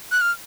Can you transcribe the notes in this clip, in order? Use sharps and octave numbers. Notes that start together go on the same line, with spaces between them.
F#6
F6